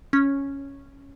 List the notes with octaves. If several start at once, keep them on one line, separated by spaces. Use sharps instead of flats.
C#4